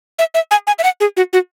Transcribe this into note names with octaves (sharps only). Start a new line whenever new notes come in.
E5
E5
G#5
G#5
E5
F#5
G#4
F#4
F#4